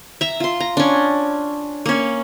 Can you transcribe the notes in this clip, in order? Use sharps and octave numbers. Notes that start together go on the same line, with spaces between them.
E5 A#5
F4 C6
A#5
C#4 D4
A#3 C#4